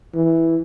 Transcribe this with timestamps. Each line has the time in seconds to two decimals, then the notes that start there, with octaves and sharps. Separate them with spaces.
0.14 E3